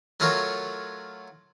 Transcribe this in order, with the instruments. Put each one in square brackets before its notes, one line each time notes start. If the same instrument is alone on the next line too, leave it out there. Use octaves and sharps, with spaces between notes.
[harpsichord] F#3 A3 F4 F#4 A#4 C#5